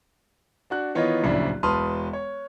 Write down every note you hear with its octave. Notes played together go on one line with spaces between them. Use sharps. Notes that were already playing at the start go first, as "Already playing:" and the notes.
D4 F#4 F#6
D#3 E3 B3 D#4 F4 C#5
D1 A#1 C#3 D4 E4
E1 B4 A5 C6 D#6 F6
C#5